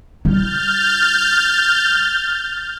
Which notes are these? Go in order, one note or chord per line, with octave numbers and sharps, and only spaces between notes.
G3 E4 F6 G6 A6